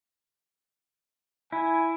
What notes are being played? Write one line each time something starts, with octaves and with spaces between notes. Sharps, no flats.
E4 G#5